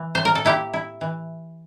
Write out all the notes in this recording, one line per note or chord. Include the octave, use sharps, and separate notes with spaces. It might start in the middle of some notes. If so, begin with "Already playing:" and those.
Already playing: E3
A2 C5
A#4
A4
A#3 E4 G4
E4
E3